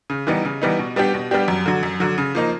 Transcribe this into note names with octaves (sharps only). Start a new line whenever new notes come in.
C#3
E3 G3 B3 D#4
C#3
E3 G3 B3 D#4
B2
G3 B3 D4 G4
B2
G3 B3 D4 G4
F#2
D3 F#3
F#2
D3 F#3
C#3
F3 A#3 D#4